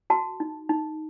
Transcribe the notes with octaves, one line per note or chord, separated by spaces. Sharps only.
F#4 A5
D#4
D#4